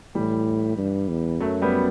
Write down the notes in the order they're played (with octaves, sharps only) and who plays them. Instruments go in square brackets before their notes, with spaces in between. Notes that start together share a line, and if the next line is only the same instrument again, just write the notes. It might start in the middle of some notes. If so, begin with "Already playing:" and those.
[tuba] A2 [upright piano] E3 G3
[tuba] G2
E2
[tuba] F#2 [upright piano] F#3 A3
[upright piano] G3 B3